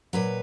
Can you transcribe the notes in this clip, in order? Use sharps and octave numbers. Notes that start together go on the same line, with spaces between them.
A#2 F#3 B4